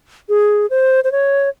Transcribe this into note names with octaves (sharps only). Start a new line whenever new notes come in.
G#4
C5
C5
C#5